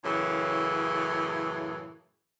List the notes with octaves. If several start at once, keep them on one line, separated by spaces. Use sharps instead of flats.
F#2 A2 C#3 E3